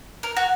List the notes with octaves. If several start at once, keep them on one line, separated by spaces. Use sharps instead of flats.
A#4
F#4